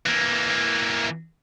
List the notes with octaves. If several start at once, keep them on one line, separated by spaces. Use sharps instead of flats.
E3 A#3